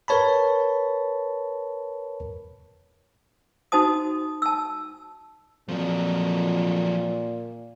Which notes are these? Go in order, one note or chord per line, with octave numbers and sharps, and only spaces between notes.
A#4 B4 C#5 A5 B5
D#4 F#4 C5 A5 D#6
A5 E6
F2 A#2 F3 F#3